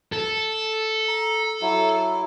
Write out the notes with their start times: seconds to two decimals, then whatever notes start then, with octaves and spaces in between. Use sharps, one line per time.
0.12 A4
1.08 A#5
1.61 F#3 E4